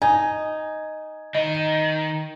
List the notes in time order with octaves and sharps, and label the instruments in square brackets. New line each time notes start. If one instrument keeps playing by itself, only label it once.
[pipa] D#4 [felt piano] G#5
[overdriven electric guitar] D#3 [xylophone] D#5